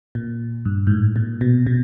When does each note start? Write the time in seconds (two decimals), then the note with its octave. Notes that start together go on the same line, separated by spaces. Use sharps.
0.15 A#2
0.65 G2
0.87 G#2
0.91 A2
1.16 A#2
1.41 B2
1.66 B2